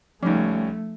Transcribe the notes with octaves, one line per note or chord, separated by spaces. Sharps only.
C#2 F3 G3 A3 C#4 D#4